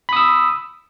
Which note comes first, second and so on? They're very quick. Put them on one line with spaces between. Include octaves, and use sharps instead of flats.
B5 D#6 E6